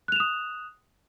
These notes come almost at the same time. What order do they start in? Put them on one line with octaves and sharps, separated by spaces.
F#6 F7 E7 D#6